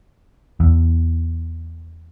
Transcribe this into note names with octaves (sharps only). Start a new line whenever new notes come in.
E2